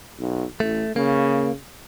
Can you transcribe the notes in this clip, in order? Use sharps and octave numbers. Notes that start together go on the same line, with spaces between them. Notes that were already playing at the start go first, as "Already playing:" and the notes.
B1
A1 A3
C#3 A#3